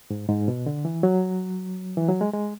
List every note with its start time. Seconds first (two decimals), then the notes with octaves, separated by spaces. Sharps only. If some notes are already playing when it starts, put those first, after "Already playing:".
0.10 G#2
0.29 G#2
0.48 B2
0.66 D3
0.85 E3
1.03 F#3
1.97 E3
2.09 F#3
2.21 G#3
2.33 G#3